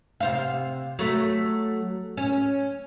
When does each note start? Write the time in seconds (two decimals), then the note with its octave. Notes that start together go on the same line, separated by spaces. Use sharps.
0.20 C3 C5 F5
0.99 F#3 A3
2.17 C#4